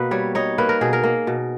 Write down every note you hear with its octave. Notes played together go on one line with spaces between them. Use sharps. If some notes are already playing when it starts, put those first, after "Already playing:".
Already playing: B2 A#3 B4
G3 C#5
D#4 C#5
A#3 B4
A#4
B2 G#4
A#4
A#3
B2